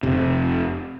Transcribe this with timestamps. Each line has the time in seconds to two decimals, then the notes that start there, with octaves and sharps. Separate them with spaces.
0.03 F1 C3